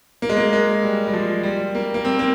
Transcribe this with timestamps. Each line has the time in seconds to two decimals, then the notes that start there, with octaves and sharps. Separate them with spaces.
0.22 A#3
0.29 G#3
0.37 A#3
0.53 G#3
0.83 G3
1.07 G3
1.13 F3
1.43 G3
1.75 A#3
1.94 A#3
2.05 C4
2.19 A#3